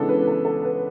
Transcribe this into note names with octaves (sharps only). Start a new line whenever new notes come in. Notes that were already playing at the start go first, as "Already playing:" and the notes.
Already playing: C#3 E3 G#3 B3 D4 A4
B4
A4
A4
B4